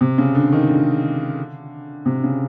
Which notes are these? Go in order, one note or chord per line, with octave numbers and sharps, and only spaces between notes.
C3
C#3
D3
D#3
D3
C3
C#3